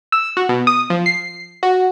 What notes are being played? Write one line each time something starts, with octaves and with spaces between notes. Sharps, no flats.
E6
F#4
B2
D#6
F3
C7
F#4